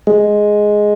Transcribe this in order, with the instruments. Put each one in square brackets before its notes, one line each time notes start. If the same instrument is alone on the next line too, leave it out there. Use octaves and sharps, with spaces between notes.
[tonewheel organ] G#3